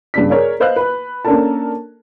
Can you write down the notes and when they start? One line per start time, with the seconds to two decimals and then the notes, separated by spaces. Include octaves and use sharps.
0.14 G2 C#3 D4 B6
0.30 G#4 A#4 C#5 D5
0.60 B4 C5 D#5 F5 F#6
0.76 B4 B5
1.25 A#3 C#4 D4 A4 A#4 A5